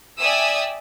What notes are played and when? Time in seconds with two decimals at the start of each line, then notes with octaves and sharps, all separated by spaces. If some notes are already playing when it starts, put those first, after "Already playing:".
0.20 D5 E5 G5 G#5 D#6 E6